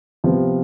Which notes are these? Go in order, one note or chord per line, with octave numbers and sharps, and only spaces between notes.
C3 F3 B3